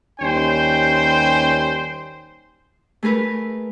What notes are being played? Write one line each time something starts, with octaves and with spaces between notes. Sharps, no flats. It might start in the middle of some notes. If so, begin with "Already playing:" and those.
D#2 G3 C#4 C5 G5
A3 G#4 A#4 B4